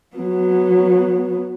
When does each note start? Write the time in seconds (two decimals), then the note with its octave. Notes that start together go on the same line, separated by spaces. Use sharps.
0.16 F#3 B3